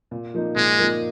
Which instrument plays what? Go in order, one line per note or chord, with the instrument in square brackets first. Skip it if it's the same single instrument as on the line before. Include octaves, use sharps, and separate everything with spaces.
[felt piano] A#2
F3 A#3 D#4
[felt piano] A#2 [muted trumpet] G#3
[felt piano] F3 A#3 D#4